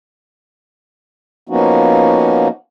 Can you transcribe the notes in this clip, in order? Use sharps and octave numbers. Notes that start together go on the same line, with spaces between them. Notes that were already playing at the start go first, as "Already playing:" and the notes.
F3 A#3 B3 C#4 D#4 F#4